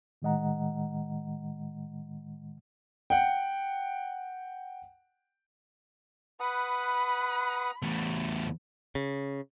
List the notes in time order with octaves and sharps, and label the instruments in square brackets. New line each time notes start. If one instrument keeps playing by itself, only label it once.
[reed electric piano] A2 D#3 G#3 D#5 F#5 A#5
[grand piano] F#5 G5
[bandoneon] B4 F#5 D#6 [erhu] B5
[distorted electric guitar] E2 A3
[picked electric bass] C#3